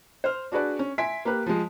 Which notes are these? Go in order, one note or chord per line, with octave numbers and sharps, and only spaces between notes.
C5 F6
D4 F#4 G#4 B4 D5
C#4
E5 G#5 C6 B6 D7
A#3 G4 B4
F3 G#3